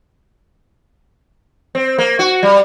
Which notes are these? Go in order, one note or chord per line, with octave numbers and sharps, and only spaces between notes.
C4
A#3
F#4
G3